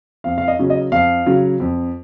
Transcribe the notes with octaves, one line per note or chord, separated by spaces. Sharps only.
F2 F5
F5
D#5
C#3 F#3 C#4
D#5
F2 F5
C#3 F#3 C#4
F2